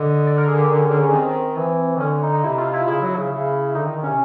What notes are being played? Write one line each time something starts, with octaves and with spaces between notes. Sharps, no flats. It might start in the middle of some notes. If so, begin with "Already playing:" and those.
Already playing: D3 D#5
D5
A#4
G#4
G4
C#4
C#4
D#3 C4
E3
D#3
D3 C#4
D#4
D#4
C3 E4
F4
E4
C#3 E4
F#3
C#3
C#3
D3 D#4
D#3
D#3
C3 C#4